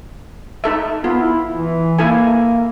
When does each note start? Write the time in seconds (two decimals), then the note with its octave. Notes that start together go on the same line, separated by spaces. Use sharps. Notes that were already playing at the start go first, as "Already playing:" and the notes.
0.64 D#4 A4 E5
1.04 B3 F4
1.21 E4
1.52 E3
1.98 A#3 E4 A4 G#5